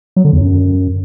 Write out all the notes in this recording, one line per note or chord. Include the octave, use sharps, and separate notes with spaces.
F#3
D3
E2
F#2